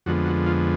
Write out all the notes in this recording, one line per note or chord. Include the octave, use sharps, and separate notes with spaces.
F2 D3 F3 G#3 B3 F#4
F#4
F4